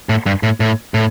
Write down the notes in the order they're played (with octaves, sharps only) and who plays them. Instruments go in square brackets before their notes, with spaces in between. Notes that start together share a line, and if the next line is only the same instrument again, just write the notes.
[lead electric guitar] A2
G2
A2
A2
A2